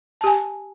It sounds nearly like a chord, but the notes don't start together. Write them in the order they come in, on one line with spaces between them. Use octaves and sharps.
A5 G4 G#5